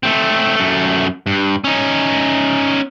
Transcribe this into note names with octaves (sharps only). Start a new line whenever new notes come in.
A3 C4
F#2 A3
G2
C#4 D#4